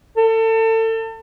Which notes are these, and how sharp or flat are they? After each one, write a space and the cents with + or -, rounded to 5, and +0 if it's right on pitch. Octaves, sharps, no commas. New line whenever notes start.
A4 +30